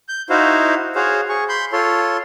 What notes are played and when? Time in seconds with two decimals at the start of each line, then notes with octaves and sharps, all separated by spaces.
0.09 G6
0.30 D#4 E4 F#4 C5 F5
0.95 F#4 G#4 C5 C#5 F5
1.29 G#4 C#6
1.49 B5 C6 G6
1.72 F4 A4 C#5 C6